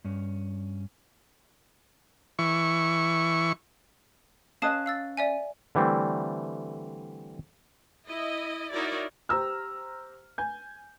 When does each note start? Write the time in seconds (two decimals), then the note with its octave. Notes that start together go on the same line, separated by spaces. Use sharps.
0.05 G2 C#4
2.39 E3 C#6
4.62 C#4 B4 D#5 F5 A5 D#6
4.86 F5 E6 A6
5.17 D5 E5 G#5
5.75 D3 E3 G3 A3 C4
8.07 E4 D#5
8.71 D#4 E4 F#4 A#4 C#5 D5
9.29 G4 C5 A#5 E6 F6
10.38 G#5 G6